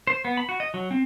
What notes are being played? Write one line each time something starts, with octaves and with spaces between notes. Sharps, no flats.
C5
B3
B5
F#4
D#5
F#3
C4